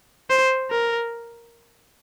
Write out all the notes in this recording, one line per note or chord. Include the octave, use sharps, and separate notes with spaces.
C5
A#4